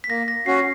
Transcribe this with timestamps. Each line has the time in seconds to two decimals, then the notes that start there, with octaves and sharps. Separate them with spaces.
0.04 B6
0.09 A#3 A#6
0.28 A#6
0.46 C#4 F#4 C7